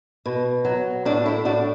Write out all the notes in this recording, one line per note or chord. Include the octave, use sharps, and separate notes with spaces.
B2
F#3
A2 D4 F#4
E4 A4
A2 D4 F#4